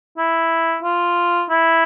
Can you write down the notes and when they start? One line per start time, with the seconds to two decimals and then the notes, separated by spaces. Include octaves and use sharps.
0.18 E4
0.83 F4
1.50 E4